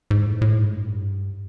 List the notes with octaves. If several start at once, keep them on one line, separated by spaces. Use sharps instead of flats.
G#2
A2
A2
G#2
G2